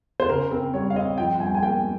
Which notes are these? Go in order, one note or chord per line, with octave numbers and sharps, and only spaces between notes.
C5
C#3 A#4
C4 A#4
G3 C#5
F5
C4 D#5
F3 G5
G2 G#5
G5
G#5
A#3 G5